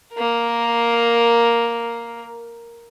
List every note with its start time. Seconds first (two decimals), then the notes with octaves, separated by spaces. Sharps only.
0.14 A#3 A#4